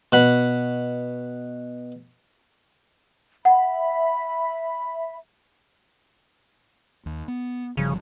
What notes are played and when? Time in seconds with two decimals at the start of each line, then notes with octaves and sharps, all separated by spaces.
0.12 B2 F#5 B5
3.45 E5 F#5 B5
7.06 D#2
7.28 B3
7.77 G1 C#3 F3 G3